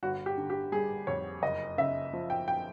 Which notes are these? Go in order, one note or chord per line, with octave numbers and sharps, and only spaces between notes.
G1 F#4
G4
D3
G4
G3 G#4
F2 C#5
F#1 D#5
C#3 E5
F3
G5
G5